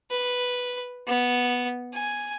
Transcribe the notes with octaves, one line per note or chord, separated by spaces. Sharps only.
B4
B3
G#5